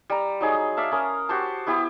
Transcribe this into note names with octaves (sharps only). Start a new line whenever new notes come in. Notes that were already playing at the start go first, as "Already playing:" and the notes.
G3 A#5
F#3 D#4 G#4
D5 E5 F5 A5
C#4 A#4 D#6
F#4 G4 C5 A5
B3 E4 G4